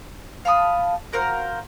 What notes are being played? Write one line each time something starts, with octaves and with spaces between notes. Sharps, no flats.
F5 A5 B5 D#6
F#4 A#4 C5 F5